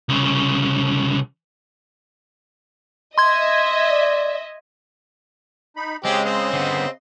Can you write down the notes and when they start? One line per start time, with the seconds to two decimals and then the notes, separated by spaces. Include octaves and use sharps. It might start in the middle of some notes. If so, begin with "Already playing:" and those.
0.09 C2 C#3
3.18 D#5 E5 C6 G#6
3.90 D5
5.76 D#4 B5
6.04 C#3 G#3 C4 G4 D#5 C6
6.25 C4
6.53 D3 B3